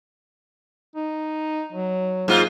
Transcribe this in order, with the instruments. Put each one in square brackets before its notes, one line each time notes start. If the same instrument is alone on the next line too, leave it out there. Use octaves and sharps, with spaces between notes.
[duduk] D#4
F#3
[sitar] G#2 F4 [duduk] A#3